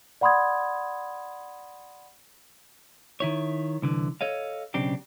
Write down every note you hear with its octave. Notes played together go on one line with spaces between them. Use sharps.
D5 F#5 B5 C6 D#6 G#6
D#3 E4 C#5
C2 D3 E3
A4 C#5 D#5 F5
B1 C#3 C4 D4 G4